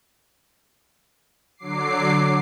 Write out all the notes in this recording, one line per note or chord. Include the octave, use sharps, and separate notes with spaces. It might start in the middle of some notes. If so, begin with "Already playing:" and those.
D3 F#3 D6 C7